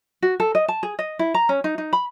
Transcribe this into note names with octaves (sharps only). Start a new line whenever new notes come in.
F#4
A4
D#5
A5
G#4
D#5
E4
A#5
C#4
D#4
D#4
B5